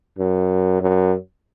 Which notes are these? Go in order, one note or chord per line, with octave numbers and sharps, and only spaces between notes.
F#2
F#2